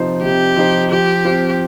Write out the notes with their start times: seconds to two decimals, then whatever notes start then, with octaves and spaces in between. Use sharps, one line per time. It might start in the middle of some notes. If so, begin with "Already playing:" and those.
Already playing: C3 F3 D#4 C5
0.22 C3 G4
0.56 F3 D#4 C5
0.91 F3 G4
1.25 C4 F4 C5